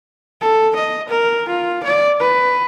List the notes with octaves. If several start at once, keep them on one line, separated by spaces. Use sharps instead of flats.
A4
D#5
A#4
F4
D5
B4